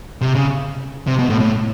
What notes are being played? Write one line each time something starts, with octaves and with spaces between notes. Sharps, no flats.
C3
C#3
C3
B2
A2
A2